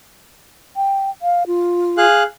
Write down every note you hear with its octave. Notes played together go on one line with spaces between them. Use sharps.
G5
F5
F4
G#4 F5 F#6